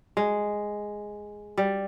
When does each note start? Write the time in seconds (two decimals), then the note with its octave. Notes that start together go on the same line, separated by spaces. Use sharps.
0.17 G#3
1.57 G3